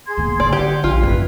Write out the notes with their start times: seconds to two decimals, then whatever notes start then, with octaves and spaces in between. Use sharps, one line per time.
0.05 G#4 C6 G#6
0.18 A#3 B3
0.40 D3 D5
0.53 G4 D5 F#5
0.84 A#1 F4 G5 G#5
1.03 F#2 E4 G#4 B4